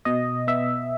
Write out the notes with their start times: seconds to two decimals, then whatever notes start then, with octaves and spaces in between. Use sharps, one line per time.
0.05 B2 D#5
0.47 B3 E5